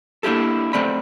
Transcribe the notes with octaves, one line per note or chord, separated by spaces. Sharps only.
A#3 D4 E4 G4 A4
A3 C4 D5 B5